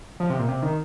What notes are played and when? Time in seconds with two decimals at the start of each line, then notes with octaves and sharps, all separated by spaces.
0.20 F3
0.30 C3
0.39 A#2
0.48 C3
0.63 D#3